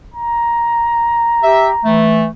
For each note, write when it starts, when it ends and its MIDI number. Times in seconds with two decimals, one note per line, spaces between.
0.14 2.03 82
1.43 1.69 67
1.43 1.69 76
1.84 2.27 52
1.84 2.27 57